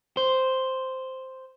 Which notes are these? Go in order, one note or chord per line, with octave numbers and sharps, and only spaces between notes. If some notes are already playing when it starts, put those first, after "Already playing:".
C5